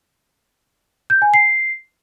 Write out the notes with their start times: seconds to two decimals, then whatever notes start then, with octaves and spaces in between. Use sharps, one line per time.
1.10 G6
1.22 G#5
1.34 C7